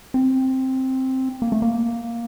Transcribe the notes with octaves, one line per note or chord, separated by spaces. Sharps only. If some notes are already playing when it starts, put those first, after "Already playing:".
C4
A#3
A3
A#3